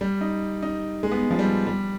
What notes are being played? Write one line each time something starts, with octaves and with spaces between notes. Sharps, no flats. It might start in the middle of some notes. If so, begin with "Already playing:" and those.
G3
D#4
D#4
G#3
B3
F3
G3
G3